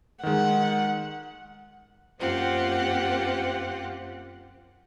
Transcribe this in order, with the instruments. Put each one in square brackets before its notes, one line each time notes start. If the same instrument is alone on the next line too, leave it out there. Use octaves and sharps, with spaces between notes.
[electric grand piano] D#3 G#3 [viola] F#5
[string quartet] F#2 A#3 C4 F4 G4 F#5